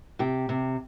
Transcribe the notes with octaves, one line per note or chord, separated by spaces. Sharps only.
C3 G4
C3